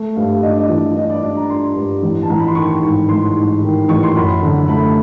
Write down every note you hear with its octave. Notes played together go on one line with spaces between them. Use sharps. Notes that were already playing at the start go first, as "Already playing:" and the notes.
Already playing: A3
G2 F5
D4 D#5
D5
D#5
E3
D4 D#5
D5
D4
A#5
D4 C6
G2
A1
A5
A1 A#5
B5
C6
D#3 C#6
G#2
A1 C6
G#2
D#3
A1 C#6
C6
F#2 B5
D3
A3 B5